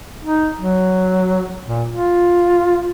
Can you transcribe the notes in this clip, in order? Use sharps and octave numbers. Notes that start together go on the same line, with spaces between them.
D#4
F#3
A#2
F4